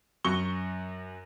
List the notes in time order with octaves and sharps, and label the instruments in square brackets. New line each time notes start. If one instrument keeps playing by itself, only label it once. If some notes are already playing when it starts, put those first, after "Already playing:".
[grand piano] F#2 F#4 C#6 G7